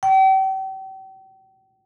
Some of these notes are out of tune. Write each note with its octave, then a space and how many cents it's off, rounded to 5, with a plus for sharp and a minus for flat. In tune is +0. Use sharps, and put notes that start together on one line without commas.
G5 -40